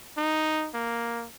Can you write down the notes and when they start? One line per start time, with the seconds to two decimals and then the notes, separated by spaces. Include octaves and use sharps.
0.17 D#4
0.74 A#3